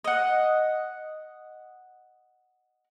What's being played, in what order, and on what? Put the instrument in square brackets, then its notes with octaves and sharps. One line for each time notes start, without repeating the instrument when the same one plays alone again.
[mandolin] D#5 F#5